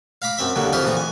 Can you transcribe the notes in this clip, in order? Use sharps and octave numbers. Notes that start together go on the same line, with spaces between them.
F5 A#5 B5 D6
F#2 C4 E5 B5
D#2 D3 F#3 G3 A#3
F2 E4 F4 G4 C5 F5
A#1 E3 A3 A#5 D#6
G#5